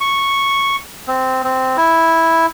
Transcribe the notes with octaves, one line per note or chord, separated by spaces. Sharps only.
C#6
C4
C4
E4